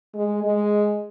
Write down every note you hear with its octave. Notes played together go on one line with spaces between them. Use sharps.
G#3
G#3